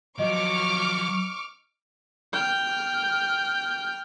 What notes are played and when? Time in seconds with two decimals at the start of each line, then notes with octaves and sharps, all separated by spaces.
0.19 F3 F#3 D#5 C#6 D6 F6
2.33 G5 F6